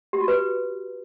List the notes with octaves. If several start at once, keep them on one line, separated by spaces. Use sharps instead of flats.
G4
F#4
B4